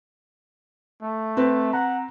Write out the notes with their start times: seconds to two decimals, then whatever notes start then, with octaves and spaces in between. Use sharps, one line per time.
1.02 A3
1.37 C4 B4
1.73 F#5 A#5